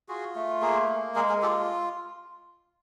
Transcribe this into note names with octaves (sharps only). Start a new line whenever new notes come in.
F4 F#4 G#4
A3
A#3 G#4 A#4
A#3
G#3 G#4 A#4
G#4 A#4
F4 G4 A4